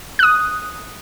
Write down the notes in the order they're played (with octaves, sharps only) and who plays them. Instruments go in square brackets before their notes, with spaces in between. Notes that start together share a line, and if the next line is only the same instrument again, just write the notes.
[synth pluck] D#6 F#6